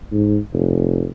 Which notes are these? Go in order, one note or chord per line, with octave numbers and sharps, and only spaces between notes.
G#2
F1